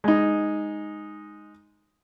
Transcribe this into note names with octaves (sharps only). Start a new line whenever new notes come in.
G#3 D#4